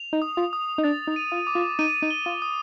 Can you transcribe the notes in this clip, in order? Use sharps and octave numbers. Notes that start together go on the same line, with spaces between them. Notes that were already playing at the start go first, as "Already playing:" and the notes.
Already playing: F7
D#4
D#6
F4
D#6
D#4
D4 A6
D#4
D#7
F4
D6
F4
D#4 D#7
D#4
G7
F4
D#6